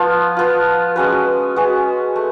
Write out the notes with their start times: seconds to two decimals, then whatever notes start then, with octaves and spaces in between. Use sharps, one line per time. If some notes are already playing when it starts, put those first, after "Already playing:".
Already playing: F3 B3 F4
0.37 F3 B3 F4
0.96 G#3 C#4 F#4 B4
1.56 G#3 C#4 F#4 B4
2.16 A3